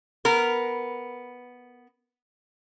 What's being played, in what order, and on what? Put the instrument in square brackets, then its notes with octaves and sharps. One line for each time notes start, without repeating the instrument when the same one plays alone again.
[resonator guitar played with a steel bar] B3 A#4